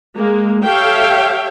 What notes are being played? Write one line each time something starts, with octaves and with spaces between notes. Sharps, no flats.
G#3 A#3
G4 A4 C#5 E5 F5 G5